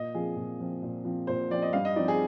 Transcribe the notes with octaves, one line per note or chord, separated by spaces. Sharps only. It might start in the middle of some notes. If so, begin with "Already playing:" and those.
Already playing: A#2 D#5
F3 C4 G#4
A#2
F3 C4
A#2
F3 C4
A#2 C5
F3 C4 D5
D#5
G2 F5
D#5
F3 C4 D#4 D5
G#4